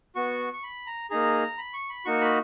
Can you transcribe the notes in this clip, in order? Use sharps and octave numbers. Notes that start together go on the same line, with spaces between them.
B3 F#4 C#6
C#6
B5
A#5
A#3 D#4 G#4 A#5
B5
C#6
B5
A#3 D#4 F#4 C#6
B5